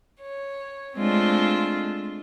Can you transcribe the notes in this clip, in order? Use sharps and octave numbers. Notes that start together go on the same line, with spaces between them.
C#5
G#3 A3 C4 D4 F4